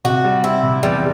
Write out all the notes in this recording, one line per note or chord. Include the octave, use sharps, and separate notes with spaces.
C3 F#4
G3
C4 E4
C3
E2 G3